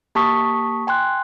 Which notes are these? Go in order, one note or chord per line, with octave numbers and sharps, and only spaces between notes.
A#3 G4 A5 C#6 D#6 B6
G5 G#5 C6 F#6